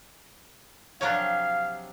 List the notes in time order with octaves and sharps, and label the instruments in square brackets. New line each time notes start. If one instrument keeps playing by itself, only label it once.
[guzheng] C3 F3 F#3 [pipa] D4 A#4 C#5 [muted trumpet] F5